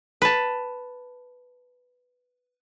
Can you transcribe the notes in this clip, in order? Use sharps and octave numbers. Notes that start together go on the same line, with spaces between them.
B4 A5